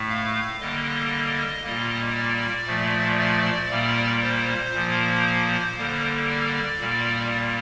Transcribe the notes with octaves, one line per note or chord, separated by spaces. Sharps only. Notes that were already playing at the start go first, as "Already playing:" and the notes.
Already playing: A2 A3
F5
D3 G3 A#3 D#5
A#2 G3 A#3
D5
A#2 F3 A3
D5
A#2 G3 A#3
C5
A#2 F3 A#3
D3 G3 A#3
D5
A#2 G3 A#3